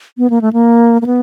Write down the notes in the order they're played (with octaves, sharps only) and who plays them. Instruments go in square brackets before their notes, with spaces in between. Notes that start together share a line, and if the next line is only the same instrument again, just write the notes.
[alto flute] B3
A#3
A3
A#3
A#3
B3